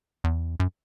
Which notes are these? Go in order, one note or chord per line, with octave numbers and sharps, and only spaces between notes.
E2
F#2